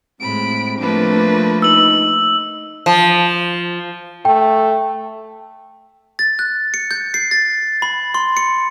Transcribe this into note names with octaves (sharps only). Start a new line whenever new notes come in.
A2 G#3 C4 B5 D7
F3 A3 A#3 D4 B4
D#4 E6 F#7
F3
A3 G5
A6
F#6
C#7
G6
C7
A6
B5
C6
C#7